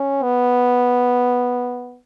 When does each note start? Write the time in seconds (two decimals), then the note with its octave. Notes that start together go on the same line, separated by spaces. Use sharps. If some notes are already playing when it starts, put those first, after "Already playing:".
Already playing: C#4
0.23 B3